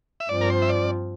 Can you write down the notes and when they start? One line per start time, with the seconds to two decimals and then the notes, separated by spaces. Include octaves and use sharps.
0.20 E5
0.29 G2 F3 C4 D5
0.41 A#4
0.50 C5
0.62 E5
0.69 D5